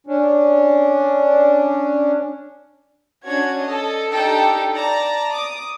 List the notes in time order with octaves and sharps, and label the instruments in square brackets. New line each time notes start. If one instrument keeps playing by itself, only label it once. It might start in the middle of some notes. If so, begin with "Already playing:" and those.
[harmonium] C#4 D4
[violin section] C#4 D4 F#4 C#5 G#6
A4 D#5
D4 D#4 G4 A4 G5
D5 A5 A#5
D6 D#6